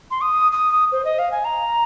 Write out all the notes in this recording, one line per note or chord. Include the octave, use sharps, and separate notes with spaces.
C6
D#6
D#6
C5
D#5
F5
G#5
A#5